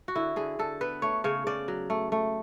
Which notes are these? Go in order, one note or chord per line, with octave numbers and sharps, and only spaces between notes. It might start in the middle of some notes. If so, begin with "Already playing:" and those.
F#4
D3 E4
D3 G#4
D3 A4
B3 B4
A3 C#5
C#3 C#5
C#3 D5
F#3
A3
A3